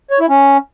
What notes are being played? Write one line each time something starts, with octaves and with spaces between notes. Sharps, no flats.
C#5
E4
C#4